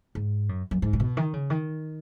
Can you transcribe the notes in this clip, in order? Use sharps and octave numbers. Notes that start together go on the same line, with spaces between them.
G#2
F#2
F#2
G#2
A#2
B2
D#3
C#3
D#3